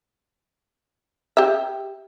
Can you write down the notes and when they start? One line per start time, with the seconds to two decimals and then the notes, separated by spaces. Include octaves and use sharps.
1.37 G4 E5